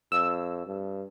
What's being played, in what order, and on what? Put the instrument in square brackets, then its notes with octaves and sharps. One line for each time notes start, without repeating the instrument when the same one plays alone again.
[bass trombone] F2 [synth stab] E6
[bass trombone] G2